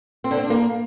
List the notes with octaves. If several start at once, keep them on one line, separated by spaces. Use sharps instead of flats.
C4
D3
C4
D4
A#3